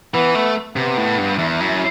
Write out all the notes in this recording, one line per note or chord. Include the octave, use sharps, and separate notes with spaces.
E3 B3
A3
C3 B3
A2
G2
E2 E4
F#2